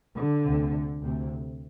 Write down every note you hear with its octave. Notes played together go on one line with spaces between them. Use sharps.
D3
D2 C3
D2 C3